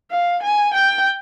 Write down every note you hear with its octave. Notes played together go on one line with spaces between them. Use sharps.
F5
G#5
G5